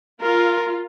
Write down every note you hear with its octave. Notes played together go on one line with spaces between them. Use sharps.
F4 A#4